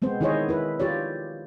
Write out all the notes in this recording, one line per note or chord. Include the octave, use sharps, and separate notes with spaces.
G#3 B3 C4 C5
D#3 E4 G#4 C5 C#5 D#5
E4 B4
F4 G4 C#5 D5